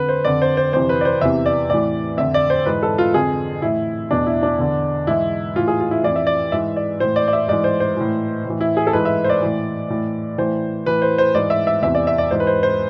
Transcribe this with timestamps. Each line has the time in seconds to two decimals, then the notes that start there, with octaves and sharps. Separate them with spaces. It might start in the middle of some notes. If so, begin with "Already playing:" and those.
Already playing: F2 D3 B4
0.09 C5
0.25 F2 D3 D5
0.42 C5
0.57 C5
0.73 F2 C3 E3 C5
0.89 B4
1.01 D5
1.05 C5
1.21 E2 C3 E3 E5
1.46 D5
1.70 A2 E3 D5
2.17 F2 D3 E5
2.34 D5
2.50 C5
2.66 G#2 E3 B4
2.83 A4
2.98 F4
3.14 F2 D3 G#4
3.62 A2 E3 E4
4.11 E2 B2 D4
4.26 E4
4.43 D4
4.59 E2 D3
5.07 G#2 E3 E4
5.56 A2 E3 F4
5.68 G#4
5.80 F4
5.91 E4
6.04 F2 E3 D5
6.16 E5
6.27 D5
6.52 G#2 E3 E5
6.76 D5
7.00 A2 E3 C5
7.16 D5
7.28 D5
7.33 E5
7.48 G#2 E3 D5
7.64 C5
7.80 C5
7.97 A2 E3
8.45 A2 E3
8.61 E4
8.77 G#4
8.87 A4
8.93 G#2 E3 B4
9.05 E5
9.24 C5
9.29 D5
9.42 A2 E3
9.90 A2 E3
10.38 A2 E3 C5
10.86 A2 E3 B4
11.02 C5
11.18 C5
11.35 G#2 E3 D5
11.50 E5
11.67 E5
11.82 E2 C3 E3 E5
11.95 D5
12.07 E5
12.18 D5
12.31 G#2 E3 C5
12.40 B4
12.47 C5
12.63 C5